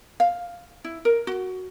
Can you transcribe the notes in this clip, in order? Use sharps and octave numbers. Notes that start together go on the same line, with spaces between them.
F5
E4
A#4
F#4